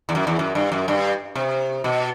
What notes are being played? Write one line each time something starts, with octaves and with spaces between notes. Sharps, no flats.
E2
F#2
E2
F#2
G2
F#2
G2
C3
B2